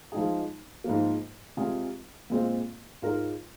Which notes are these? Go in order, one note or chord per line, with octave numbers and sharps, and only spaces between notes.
F3 G#3 D#4 G#4
G#2 F3 A#3
C3 G#3 F4 G#4
A#2 G#3 C4 F4
G#2 G#3 F4 A#4